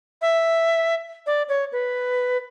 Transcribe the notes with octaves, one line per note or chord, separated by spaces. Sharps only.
E5
D5
C#5
B4